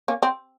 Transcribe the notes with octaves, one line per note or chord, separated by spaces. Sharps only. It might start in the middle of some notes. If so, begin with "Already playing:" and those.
A#3 C#4
C4